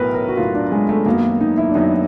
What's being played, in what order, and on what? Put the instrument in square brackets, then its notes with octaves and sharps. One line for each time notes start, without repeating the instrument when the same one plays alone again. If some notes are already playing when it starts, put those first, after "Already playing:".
Already playing: [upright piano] B1 A2 F#3 B3 [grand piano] A#4 B4
[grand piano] A#4
F#4
[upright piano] B1 A2 F#3 B3 [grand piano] F4
[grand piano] D4
G#3
A3
[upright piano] F#2 D#3 F#3 B3 [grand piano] A#3
[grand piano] D#4
E4
D4
[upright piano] F#2 D#3 F#3 B3 [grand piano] D#4